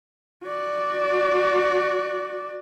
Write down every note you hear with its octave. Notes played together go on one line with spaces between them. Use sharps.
F#4 D5